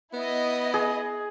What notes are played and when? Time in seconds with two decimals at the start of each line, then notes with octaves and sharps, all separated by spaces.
0.13 B3 E4 D#5
0.74 G#4